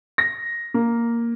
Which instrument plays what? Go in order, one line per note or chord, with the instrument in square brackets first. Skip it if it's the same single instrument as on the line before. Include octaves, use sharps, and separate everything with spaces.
[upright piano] A#6
A#3